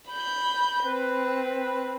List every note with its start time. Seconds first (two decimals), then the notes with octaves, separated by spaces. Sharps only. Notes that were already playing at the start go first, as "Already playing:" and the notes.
0.10 B5 G6
0.85 C4 B4